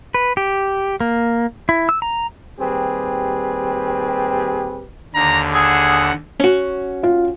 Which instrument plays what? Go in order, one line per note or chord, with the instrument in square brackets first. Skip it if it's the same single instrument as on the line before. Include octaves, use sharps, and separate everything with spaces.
[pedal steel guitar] B4
G4
A#3
E4
E6
A#5
[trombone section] D#2 G3 C4 G4 G#4 B4
[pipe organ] D#2 D3 [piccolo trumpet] A#5
[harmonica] G#4 E6 [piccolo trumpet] F#5
[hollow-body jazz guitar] C#4 F#4
[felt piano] F4